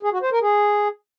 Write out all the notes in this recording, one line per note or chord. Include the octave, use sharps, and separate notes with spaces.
G#4
F#4
C5
A#4
G#4